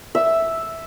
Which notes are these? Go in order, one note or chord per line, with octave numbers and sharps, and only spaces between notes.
E5